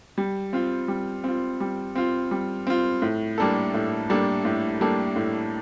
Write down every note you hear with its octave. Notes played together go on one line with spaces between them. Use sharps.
G3
C4 F4
G3
C4 F4
G3
C4 F4
G3
C4 F4
A2
G3 A#3 D4 A4
A2
G3 A#3 D4 A4
A2
G3 A#3 D4 A4
A2